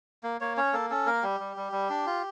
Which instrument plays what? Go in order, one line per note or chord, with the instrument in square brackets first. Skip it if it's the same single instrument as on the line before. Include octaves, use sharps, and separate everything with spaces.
[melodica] A#3
A#3 C#5
C#4 C#5
A#3 A4
C#4 A4
A#3 A#4
G3 G4
G3
G3
G3
D4
F4